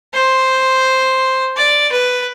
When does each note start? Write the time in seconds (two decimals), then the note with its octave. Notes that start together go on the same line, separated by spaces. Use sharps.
0.14 C5
1.56 D5
1.92 B4